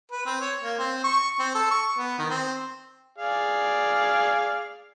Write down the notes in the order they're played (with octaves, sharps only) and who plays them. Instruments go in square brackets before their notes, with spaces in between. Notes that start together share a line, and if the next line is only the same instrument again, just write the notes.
[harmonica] B4
C4
C#5
A#3
C4
C#6
C4
A4
C#6
B3
D#3
C4
G#4 D5 F5